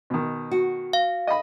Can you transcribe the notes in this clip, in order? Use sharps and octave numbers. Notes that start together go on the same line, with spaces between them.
B2 D#3
F#4
F5
D#5 B5